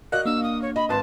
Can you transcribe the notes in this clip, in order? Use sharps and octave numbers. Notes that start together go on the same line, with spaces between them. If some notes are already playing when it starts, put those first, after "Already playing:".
F#4 A#4 D5 D#5 F5 F#6
A#3 D4 E6
D#6
C#5
D#5 B5
G#1 B4 A5 C6 D#6